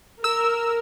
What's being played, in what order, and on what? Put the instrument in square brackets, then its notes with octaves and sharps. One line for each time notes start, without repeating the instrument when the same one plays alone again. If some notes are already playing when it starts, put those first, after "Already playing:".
[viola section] A#4 [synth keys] E6